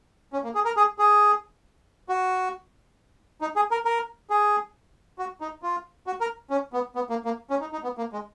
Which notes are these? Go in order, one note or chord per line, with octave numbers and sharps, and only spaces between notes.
C#4
A#3
G#4
A#4
G#4
G#4
F#4
D#4
G#4
A#4
A#4
G#4
F#4
D#4
F4
F#4
A#4
C#4
B3
B3
A#3
A#3
C#4
D#4
D#4
B3
A#3
G#3